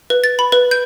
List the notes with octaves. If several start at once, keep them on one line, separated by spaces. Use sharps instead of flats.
B4
A6
B5
B4
G6